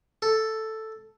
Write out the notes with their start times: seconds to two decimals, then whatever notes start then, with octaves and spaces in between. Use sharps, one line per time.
0.22 A4